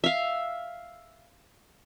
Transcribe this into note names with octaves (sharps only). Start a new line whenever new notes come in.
E5 F5